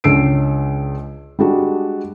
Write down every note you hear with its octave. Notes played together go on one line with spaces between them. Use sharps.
C#2 C#4 D4 E6 C7 D7
G3 G#3 D4 F#4